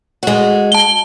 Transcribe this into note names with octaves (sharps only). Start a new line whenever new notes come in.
G#3 F#4
A5 G7